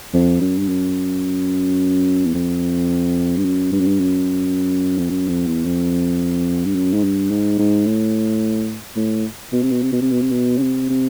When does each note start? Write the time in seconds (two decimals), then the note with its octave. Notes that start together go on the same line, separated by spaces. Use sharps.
0.13 F2
0.41 F#2
0.58 G2
0.68 F#2
2.25 E2
2.34 F2
3.37 G2
3.45 F#2
3.72 G2
3.80 F#2
3.87 G2
4.00 F#2
4.98 F2
5.10 F#2
5.28 F2
5.47 E2
5.65 F2
6.65 G2
6.75 F#2
6.94 G#2
7.04 G2
7.30 G#2
7.59 G#2
7.86 A2
8.96 A2
9.52 B2
9.62 C3
9.71 B2
9.82 C3
9.92 B2
10.02 C3
10.11 B2
10.22 C3
10.31 B2
10.58 C#3
10.62 C3
10.89 C3